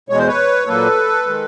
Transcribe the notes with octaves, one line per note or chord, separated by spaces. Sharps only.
E2 B2 G#3 C#5
C5
B4 C#5
A#2 F#3 A#3 A4 B4
D#3 G#3